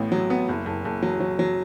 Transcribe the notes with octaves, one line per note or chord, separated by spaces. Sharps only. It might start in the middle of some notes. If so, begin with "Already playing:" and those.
Already playing: A1 A2 B3
F#3
B3
F#1
F#1
F#1
F#3
F#3
F#3